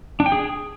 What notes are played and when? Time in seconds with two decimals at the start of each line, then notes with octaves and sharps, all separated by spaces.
0.20 D4
0.26 G5
0.32 G#4